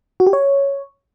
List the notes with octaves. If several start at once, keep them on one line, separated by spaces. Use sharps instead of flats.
F#4
G4
C#5